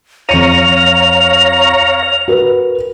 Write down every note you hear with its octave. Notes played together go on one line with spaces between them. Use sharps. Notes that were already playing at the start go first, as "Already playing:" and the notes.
F2 C#5 F5 A#5 C#7 D#7 F7
F#4 A#4 B4